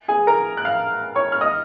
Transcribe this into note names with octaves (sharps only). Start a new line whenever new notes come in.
G#4 G#5
A#4 A#5
F#6
F5 F6
C#5 C#6
F6
D#5 D#6